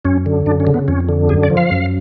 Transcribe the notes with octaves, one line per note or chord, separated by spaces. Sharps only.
F#2 C#4
D3
F#2 D4
C#4
C#3
B3
F2 C#4
D3
F#2 G#4
D5
F3
F5
F#2